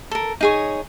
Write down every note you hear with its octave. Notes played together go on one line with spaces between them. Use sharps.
A4 A#4
D#4 G#4 C#5